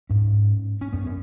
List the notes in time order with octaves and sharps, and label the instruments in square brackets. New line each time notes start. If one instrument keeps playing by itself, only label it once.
[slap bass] G#2 C#4
C#4
F#2 B3
C#4